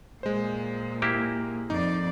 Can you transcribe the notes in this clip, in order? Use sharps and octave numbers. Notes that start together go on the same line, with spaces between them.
A#2 G#3 C5
A#3 E4 G4
F2 D#4 D5